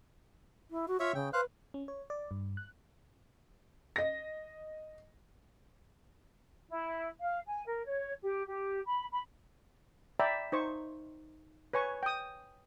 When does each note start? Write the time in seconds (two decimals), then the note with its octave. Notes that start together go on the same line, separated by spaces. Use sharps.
0.71 E4
0.88 F#4
1.00 F4 C#5 E5
1.15 C#3 G5
1.33 B4 C5 F5 F#6
1.74 C#4
1.88 C#5
2.10 D5
2.31 G2
2.57 F#6
3.96 D#5 A#6
6.68 E4
7.20 F5
7.45 G#5
7.66 A#4
7.85 C#5
8.22 G4
8.46 G4
8.85 B5
9.10 B5
10.20 D5 E5 G5 A#5 B5
10.52 D#4 C5 C#6
11.73 B4 C#5 G#5 C#6
12.03 G5 D#6